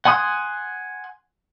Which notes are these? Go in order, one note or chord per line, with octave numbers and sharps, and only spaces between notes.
F#5 G#5 C6 D#6 F#6